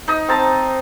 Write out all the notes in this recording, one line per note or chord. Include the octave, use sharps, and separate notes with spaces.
D#4 D#5
C4 A5 A#5